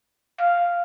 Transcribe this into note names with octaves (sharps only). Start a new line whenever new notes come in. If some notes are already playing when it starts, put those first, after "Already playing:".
F5